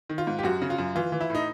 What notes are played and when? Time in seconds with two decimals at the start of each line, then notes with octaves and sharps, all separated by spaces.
0.10 D#3
0.18 F4
0.27 G#2
0.39 G4
0.43 F#2 F#4
0.62 C#3
0.70 F4
0.78 F#2
0.95 E3 F4
1.12 E3
1.21 E4
1.30 A2 D#4